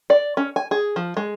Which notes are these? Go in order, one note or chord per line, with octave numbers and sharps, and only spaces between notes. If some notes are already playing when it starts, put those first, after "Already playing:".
D5
C#4
G#5
G#4
F3
G#3